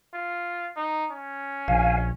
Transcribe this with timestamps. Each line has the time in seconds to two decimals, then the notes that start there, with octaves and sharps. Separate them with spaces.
0.14 F4
0.77 D#4
1.12 C#4
1.68 A#1 F5 G#5